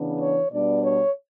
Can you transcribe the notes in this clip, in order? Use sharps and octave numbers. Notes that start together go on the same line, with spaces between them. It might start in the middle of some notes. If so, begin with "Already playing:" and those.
Already playing: C#3 E3 B3 D4
C#5
B2 G3 B3 D4 D5
C#5